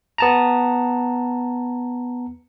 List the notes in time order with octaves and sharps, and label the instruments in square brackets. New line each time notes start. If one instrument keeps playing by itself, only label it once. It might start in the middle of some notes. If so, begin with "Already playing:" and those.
[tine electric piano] B3 A5 A#5